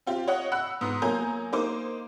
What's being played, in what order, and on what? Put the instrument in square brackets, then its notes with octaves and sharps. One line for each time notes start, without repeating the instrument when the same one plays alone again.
[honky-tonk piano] C4 F4 G4
C#5 D#5 F#5
F#5 B5 E6 F#6
G#2 B3 D#6
F#3 A#3 G#5 A#5 G6
A#3 D#4 C5 D6